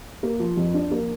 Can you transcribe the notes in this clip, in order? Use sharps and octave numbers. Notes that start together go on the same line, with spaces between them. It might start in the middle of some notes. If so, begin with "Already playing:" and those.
A#3
F3
F2
D4
A#3